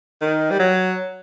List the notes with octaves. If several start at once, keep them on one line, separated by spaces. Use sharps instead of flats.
D#3
G3
F#3